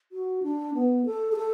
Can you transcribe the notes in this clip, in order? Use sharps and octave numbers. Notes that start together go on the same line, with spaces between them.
F#4
D4
B3
A4
G#4
A4